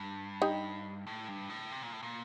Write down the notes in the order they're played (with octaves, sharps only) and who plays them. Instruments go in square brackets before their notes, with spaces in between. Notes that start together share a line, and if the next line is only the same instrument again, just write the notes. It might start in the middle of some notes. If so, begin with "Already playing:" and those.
Already playing: [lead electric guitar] G2
[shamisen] D#4 G4
[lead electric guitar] A2
G2
A2
C3
A#2
A2
A#2